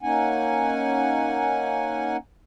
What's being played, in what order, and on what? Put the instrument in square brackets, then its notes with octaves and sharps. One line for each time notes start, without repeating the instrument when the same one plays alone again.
[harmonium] A#3 C#4 D#4 F#5 G#5